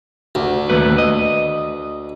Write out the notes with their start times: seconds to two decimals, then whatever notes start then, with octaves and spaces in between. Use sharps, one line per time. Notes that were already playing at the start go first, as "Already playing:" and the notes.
0.35 D2
0.70 D#2 A3 B4
0.98 D#5